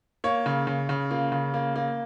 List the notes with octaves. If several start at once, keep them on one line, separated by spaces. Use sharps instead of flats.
A#3 C#5
C#3
C#3
C#3
A#3 F4
C#3
A#3
A#3